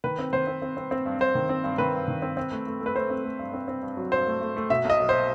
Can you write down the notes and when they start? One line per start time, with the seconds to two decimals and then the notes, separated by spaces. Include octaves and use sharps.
0.04 D#3 B4
0.19 C4
0.33 D#3 C5
0.47 C4
0.62 C4
0.77 C4
0.91 C4
1.06 G2
1.20 G2 C5
1.35 D#3
1.49 C4
1.64 G2
1.78 D#3 B4
1.93 G2
2.08 D#3
2.22 C4
2.37 C4
2.52 A3
2.67 A3
2.81 A3
2.86 B4
2.95 A3 C5
3.10 C4
3.24 A3
3.39 G2
3.53 C4
3.68 C4
3.83 G2
3.97 F#3
4.12 G2 C5
4.27 A3
4.41 A3
4.56 A3
4.70 B2 E5
4.85 B1 D#5
5.00 F#3
5.09 C5